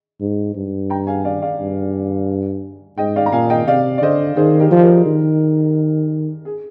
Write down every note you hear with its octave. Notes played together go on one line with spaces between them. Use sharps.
G#2
G2
G5 A#5
F5 G#5
D5 F5
D5 F5
G2
G#2 D#5 G5
D5 F5
A#5
A#2 F5 G#5
D#5 G5
C3 D5 F5
D5
D3 C5 D#5
D#3 G#4 C5
G4 A#4
F3
G4 A#4
D#3
G#4